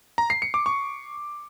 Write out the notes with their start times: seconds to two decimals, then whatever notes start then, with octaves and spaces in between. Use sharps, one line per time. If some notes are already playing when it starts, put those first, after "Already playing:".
0.18 A#5
0.30 C7
0.42 C#7
0.54 D6
0.66 C#6